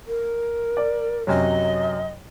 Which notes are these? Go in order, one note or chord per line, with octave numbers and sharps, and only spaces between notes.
A#4
D5
F#2 C3 F#3 D#5